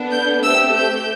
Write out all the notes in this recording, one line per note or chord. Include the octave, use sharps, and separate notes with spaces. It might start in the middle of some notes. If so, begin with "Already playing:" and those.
Already playing: B3 D4 A4
G6
A3 C4 G4 E6
G6